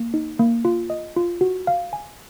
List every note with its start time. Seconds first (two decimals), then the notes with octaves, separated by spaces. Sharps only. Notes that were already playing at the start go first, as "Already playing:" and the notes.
Already playing: A#3
0.14 D#4
0.39 A#3
0.65 F4
0.90 D#5
1.16 F4
1.41 F#4
1.67 F5
1.93 G#5